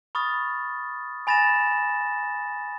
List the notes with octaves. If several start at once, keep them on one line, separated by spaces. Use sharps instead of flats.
B5 C#6 D#6 F6 A6
G#5 B5 A6 A#6 E7